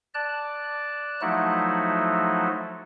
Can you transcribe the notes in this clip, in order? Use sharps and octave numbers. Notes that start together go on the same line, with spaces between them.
D5 A5 F#6
F3 F#3 A3 D#4 E4 F#4